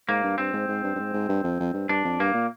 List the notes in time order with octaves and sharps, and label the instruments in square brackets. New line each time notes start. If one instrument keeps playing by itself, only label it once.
[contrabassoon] G#2 [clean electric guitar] A#3
[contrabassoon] G2
[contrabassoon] G2 [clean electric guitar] C4
[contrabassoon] G#2
G#2
G2
G2
G#2
G#2
G2
F2
F2
G2
[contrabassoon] G2 [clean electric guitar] D4
[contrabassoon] F2
[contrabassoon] G2 [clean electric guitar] A#3
[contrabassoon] A#2